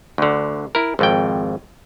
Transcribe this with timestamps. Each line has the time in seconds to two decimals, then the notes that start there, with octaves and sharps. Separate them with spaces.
0.18 D2 D3
0.75 E4 A#4
0.99 G#1 F2 G5